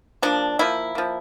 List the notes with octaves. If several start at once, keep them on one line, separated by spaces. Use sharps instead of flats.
F3 A#3 D4
F3 A#3 E4
F3 A#3